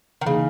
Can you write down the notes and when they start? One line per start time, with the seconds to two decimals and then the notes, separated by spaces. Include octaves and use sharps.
0.21 D#3
0.26 C#3 E3 A#3 D#4